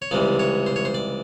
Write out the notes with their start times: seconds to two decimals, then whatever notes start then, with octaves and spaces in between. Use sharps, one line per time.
0.02 C#5
0.11 C#2 C3 E3 G3 D5
0.39 C#5
0.66 C5
0.76 C#5
0.85 C5
0.94 D5